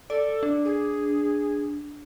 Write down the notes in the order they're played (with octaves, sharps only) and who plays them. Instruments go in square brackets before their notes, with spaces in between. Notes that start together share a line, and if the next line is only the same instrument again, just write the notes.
[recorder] A4 [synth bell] D5
[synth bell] D4
[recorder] G#4